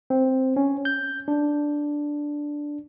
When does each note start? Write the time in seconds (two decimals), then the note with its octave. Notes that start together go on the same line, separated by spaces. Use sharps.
0.10 C4
0.56 C#4
0.85 G6
1.28 D4